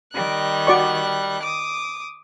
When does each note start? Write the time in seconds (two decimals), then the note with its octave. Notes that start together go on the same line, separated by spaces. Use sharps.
0.14 D#3 G3 F#6
0.67 F#4 D5 C#6
1.42 D6 D#6